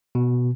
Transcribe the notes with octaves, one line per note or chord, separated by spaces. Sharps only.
B2